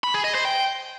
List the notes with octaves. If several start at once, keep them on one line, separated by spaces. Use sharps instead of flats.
B5
G#4
D#5
C5
G5